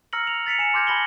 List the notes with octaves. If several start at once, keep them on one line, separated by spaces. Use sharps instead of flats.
A#5 E6 F6 A#6 C#7 F#7
F7
A6 B6 C#7 F7
G#5 C#7 E7
C6 D6 F6 G6 G#6 A#6
A5 B5 A#6 F#7 G7